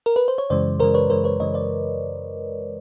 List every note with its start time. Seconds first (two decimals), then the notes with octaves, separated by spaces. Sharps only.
0.06 A#4
0.16 B4
0.28 C5
0.38 C#5
0.50 F#2 C#3 E3 G#3 C5 D5
0.80 F#2 C#3 E3 G#3 A#4 C5
0.94 B4 C#5
1.10 F#2 C#3 E3 G#3 A#4 C5
1.24 B4 C#5
1.40 F#2 C#3 E3 G#3 C#5 D#5
1.54 C5 D5